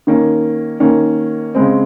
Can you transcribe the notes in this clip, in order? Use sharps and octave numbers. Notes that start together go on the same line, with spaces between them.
D#3 A#3 C#4
D#3 A#3 C#4
C#3 G#3 C4